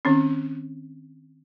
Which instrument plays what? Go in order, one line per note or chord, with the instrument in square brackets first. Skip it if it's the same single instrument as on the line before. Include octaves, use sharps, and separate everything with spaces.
[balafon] D#3 C4 C#4